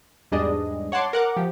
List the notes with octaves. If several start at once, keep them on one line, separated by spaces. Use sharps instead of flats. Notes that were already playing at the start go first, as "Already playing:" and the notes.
E2 G#2 G3 D4 G#4 D#5
C#5 F#5 A5 C6 D6
A#4 F#5 D6
F3 G4